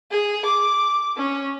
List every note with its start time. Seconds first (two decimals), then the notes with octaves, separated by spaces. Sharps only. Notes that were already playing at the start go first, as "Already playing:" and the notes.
0.11 G#4
0.45 D6
1.17 C#4